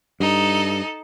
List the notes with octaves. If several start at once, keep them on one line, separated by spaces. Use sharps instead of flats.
G2 D#4 A4